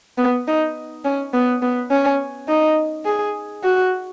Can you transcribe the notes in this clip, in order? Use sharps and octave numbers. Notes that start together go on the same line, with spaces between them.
B3
D#4
C#4
B3
B3
C#4
D#4
G#4
F#4